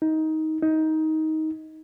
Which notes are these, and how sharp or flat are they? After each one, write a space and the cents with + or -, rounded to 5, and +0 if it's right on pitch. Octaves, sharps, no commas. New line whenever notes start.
D#4 +15
D#4 +15